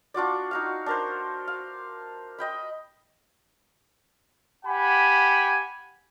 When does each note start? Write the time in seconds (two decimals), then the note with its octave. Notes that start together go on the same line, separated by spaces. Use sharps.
0.14 D4 F4 F#4 D5
0.51 D#4 F#4 F5
0.86 D4 A#4 C5
1.47 F5
2.38 D#5 G5 B5
4.65 G4 F#5 G#5 B5